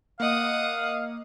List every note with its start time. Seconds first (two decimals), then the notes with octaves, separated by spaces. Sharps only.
0.20 A#3 D#5 F5 F#5 D#6